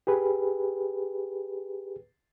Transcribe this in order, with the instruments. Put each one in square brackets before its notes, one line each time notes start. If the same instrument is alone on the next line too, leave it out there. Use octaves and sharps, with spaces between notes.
[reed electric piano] G4 G#4 B4